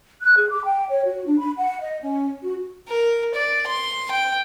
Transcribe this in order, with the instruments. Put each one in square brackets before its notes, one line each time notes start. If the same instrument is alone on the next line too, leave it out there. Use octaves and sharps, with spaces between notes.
[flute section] F#6
G#4
D6
G5
C#5
F#4
D4
B5
F#5
D#5
C#4
F#4
[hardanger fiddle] A#4
D5
C6
G5